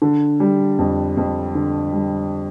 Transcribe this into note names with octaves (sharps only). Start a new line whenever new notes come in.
D3
G3
F2
F2
D3
G3